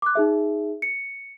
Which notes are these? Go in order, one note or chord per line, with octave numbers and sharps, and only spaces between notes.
D6 F#6
D#4 G#4 E5
C#7